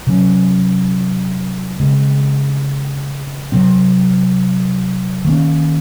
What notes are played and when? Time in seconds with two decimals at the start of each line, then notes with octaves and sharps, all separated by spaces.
0.07 C3 F#3 C#4
1.80 C#3 G#3 C4
3.52 C3 F#3 C4
5.25 D#3 A#3 C#4